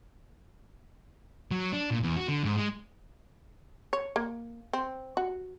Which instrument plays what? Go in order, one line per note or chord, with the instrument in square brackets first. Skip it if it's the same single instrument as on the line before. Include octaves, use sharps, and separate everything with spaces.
[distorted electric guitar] F#3
D4
A#2
E2
F#4
D3
G#2
G#3
[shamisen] C#5
A#3
C4
F#4